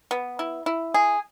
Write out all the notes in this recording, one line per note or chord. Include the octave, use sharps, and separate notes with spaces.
B3
E4
E4
G#4